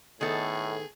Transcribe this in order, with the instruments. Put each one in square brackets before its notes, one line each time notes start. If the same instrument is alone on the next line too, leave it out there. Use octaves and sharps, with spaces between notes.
[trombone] A2 [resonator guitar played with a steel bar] D#3 B3 A4 [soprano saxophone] G#4